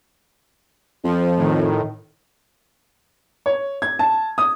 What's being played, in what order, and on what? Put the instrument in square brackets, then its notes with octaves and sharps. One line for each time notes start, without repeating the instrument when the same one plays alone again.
[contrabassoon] F2 [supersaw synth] F3
[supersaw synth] A2 D#3
[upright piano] C#5
G#6
A5
D#6